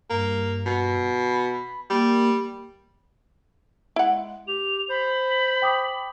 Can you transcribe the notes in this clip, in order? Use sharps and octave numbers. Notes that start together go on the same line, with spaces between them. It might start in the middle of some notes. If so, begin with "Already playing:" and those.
G2 A#3
B2
B5
G3 A#3
G#3 E4 F#5
G4 F7
C5 B5
G5 D6 D#6